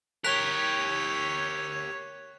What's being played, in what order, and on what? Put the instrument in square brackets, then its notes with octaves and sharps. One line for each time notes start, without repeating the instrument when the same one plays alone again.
[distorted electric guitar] G4 A#4 [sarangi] C#5 [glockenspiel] F#6 B6 F7